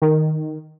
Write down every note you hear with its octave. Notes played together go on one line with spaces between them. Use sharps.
D#3